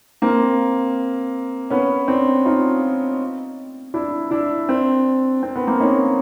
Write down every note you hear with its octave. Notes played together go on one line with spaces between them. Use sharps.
A#3 C4
B3 C#4
C4 D4
D#4 F4
D4 E4
D4 E4
C4 D4
C4
B3
A#3 C4
C#4 D#4